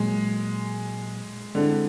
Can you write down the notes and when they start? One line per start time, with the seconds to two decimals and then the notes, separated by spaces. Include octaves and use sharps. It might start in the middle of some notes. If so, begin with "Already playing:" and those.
Already playing: A#2 F#3 G#3 A#3
1.55 D3 G#3 C4 E4